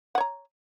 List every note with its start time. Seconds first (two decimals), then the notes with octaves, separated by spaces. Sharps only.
0.15 F#5
0.18 C#5
0.20 A#5